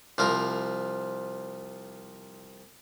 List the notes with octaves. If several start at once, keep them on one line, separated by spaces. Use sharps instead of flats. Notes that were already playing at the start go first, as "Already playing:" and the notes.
C2 F3 A#4